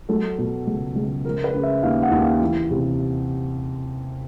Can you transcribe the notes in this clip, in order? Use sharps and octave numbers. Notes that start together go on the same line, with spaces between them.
F#3 A4
B2
C#2
C#2
F3 A#4
B4
C#3
E5
D#2 F5
F#5
D#2
F5
E3
C3